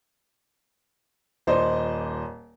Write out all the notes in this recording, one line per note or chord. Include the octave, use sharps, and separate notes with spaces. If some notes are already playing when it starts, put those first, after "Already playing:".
D#1 C5 D5 D#5